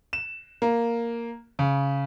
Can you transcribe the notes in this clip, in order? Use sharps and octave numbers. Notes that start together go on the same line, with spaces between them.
E7
A#3
C#3